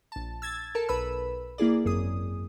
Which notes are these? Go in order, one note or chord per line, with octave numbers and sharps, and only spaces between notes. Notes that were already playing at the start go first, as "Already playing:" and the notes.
A#1 A5
E6 G#6 A6
A4 A#4 A5
B1 B4 B5 E6
A#3 E4 G#4 D5
G#1 F#2 G#4 D#6